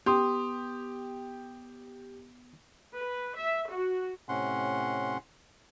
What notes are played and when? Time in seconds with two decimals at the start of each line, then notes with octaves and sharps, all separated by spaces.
0.06 B3 G4 C6 D#6
2.95 B4
3.37 E5
3.70 F#4
4.29 A2 C3 C#4 F#5 C6